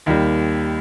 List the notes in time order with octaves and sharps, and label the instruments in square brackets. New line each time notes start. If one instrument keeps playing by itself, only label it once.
[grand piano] D#2 D#3 G3